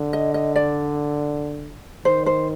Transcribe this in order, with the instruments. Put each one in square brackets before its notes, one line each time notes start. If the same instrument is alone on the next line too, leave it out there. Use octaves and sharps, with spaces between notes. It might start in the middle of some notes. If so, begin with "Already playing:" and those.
Already playing: [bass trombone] D3
[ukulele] D#5
D#5
D5
[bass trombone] D#3 [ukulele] C5
[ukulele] C5